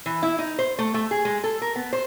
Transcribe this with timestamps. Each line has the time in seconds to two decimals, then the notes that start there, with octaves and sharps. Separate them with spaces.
0.06 E3
0.23 E4
0.39 D#4
0.59 C5
0.78 A3
0.94 A3
1.11 G#4
1.25 G#3
1.44 A4
1.62 A#4
1.76 B3
1.93 C5